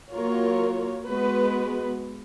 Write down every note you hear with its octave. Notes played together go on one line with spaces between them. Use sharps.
F#3 A#3 F4 A#4 C#5
G#3 B3 F#4 B4